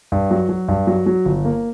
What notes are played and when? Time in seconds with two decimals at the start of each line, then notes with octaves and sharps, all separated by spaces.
0.12 G2
0.31 F#3
0.49 F#3
0.68 G2
0.87 F#3
1.06 F#3
1.25 G1
1.45 A#3